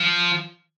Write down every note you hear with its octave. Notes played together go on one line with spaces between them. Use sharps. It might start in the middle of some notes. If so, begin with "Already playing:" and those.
Already playing: F3